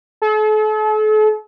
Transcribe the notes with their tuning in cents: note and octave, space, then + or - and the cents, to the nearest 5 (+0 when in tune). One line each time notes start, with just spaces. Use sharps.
A4 -40